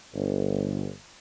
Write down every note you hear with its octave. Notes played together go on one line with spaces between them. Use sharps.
G1